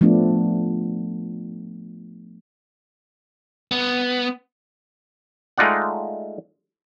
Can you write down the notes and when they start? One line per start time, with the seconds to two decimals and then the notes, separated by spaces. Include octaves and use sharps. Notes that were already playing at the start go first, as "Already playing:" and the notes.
0.01 F3 A3 B3 D4
3.71 B3
5.58 G#3 A3 D#4 F4 D5 F#5